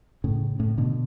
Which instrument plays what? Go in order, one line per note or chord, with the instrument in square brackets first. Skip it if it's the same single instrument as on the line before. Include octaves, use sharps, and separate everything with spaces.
[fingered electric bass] A2 C#3
A2 C#3
B2 D3